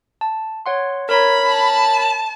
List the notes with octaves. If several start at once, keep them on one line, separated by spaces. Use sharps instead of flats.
A5
C#5 F#5 C6
A#4 C#5 A#5 B5
A5